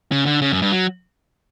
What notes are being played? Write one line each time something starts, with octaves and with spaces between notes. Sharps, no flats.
C#3
D3
C#3
F#2
G2
F#3